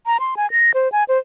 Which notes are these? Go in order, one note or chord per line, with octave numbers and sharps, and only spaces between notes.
A#5
C6
G#5
A#6
C5
G#5
C5